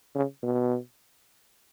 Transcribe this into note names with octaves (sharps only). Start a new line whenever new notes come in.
C#3
B2